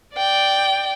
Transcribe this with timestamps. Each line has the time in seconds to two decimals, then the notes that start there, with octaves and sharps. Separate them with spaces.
0.16 D5 G5